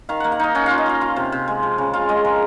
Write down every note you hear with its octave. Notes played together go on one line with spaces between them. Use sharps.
D#3 F5
A#3 F#5
F5
D#4 D#5
C#4 F#5
F4 F5
D#5
F4 F5
F4
C3
C3
G#3
F3
C#3
F4 F5
G#3 D#5
F3 A#4